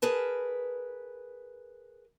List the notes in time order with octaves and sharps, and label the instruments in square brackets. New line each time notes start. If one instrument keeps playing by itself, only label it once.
[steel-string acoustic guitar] G#4 A#4 B4 A5